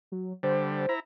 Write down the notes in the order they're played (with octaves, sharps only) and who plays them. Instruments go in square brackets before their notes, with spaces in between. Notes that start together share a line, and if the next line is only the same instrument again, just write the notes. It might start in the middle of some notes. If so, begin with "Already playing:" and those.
[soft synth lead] F#3
[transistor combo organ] D3 G3 [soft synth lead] C5
[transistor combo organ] E4 A#5